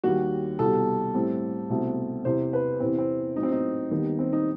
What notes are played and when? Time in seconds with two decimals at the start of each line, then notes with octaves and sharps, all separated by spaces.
0.04 D#2 D#3 G3 F#4
0.59 C2 B2 G3 A4
1.15 A2 G3 C4
1.69 C2 B2 A3 C4
2.25 E2 C3 E3 C5
2.53 B4
2.80 E2 C3 E3 B3 C4
2.98 C4
3.35 A2 F#3 B3 D#4
3.43 C4
3.52 D#4
3.91 D#2 D#3 G3 B3
4.19 C4
4.33 D#4